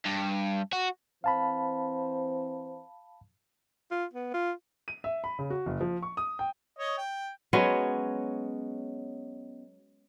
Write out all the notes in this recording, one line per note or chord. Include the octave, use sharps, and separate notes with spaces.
G2
F#4
E3 C4 C5 F5 A5 B5
F4
B3
F4
D#7
E5
B5
C#3
F#4
F#1
F3
C#6
D#6
G5
C#5 D#5
G5
F#3 G#3 B3 C#4